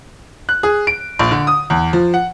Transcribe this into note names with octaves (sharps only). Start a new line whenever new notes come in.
F#6
G#4
D7
A#1
D3
D#6
E2
F3
F#5